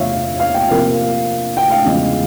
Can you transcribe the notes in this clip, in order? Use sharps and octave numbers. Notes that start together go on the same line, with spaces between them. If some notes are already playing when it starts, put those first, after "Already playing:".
Already playing: E2 C3 F3 C#5 E5 F5
F5
G5
C3 F3 A#3 F5
G5
F5
E2 C#3 F3 G#3